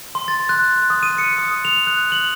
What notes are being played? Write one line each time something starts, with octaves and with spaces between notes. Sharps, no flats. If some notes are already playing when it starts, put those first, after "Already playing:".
C6
A6
F#6
D#6
D#7
C#7
D#6
F7
F#6
F#7